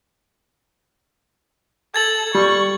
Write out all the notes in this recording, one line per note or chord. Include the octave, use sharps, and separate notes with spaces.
A4 G#6 A6 F#7
G3 C#6